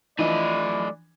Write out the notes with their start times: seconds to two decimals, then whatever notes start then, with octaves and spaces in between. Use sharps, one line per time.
0.19 E3 F3 A3 D4 E4 D5 D#5